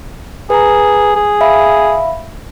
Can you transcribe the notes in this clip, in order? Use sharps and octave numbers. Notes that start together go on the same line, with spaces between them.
G#4 B4 A#5
G#4
E5 F5 B5